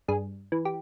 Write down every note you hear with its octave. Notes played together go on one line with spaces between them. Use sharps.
G2 G#4
E3
G4